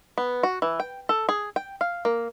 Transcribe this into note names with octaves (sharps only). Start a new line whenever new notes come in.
B3
F#4
E3
G5
A4
G#4
G5
F5
A#3